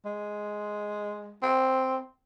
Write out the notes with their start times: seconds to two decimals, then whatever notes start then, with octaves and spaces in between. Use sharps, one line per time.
0.05 G#3
1.43 C4